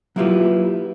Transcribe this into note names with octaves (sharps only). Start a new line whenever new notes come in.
F#3 A#3 E4 F4 G4 B4